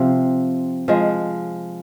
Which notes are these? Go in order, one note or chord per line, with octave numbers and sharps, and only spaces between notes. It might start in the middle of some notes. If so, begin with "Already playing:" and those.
Already playing: C3 F3 C4
F3 G#3